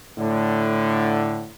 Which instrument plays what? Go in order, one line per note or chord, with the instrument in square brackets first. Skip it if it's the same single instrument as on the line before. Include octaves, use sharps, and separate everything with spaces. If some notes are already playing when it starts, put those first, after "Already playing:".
[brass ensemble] A2 D3